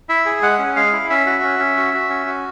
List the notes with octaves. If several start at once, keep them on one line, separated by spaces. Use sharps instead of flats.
E4 E5
G#4
G#3 F#5
C#4
G#3 F5
E4
C#4 E5
F#4
C#4
C#4
F#4
F#4
C#4
F#4